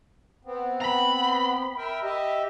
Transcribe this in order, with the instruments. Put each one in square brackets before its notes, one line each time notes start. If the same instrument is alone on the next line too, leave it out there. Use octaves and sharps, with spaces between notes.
[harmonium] B3 C4
[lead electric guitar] A#5 B5
[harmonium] A#4 E5 G5
G4 D#5 E5